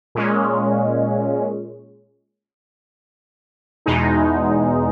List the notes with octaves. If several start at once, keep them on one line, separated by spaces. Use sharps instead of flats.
A#2 G#3 C#4
E2 B2 G#3 D#4